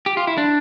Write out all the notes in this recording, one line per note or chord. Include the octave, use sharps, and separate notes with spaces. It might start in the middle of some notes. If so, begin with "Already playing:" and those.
G4
F4
E4
D4